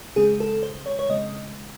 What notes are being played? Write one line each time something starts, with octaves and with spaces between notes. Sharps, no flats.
C#3 G#3 C4 G#4
A4
C5
C#5
C#5
C#3 G#3 C4 D#5